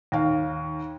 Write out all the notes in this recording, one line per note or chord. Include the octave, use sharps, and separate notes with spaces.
D#2 F5